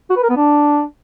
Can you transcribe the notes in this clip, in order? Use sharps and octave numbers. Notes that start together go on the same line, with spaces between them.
F#4
B4
A#4
B3
D4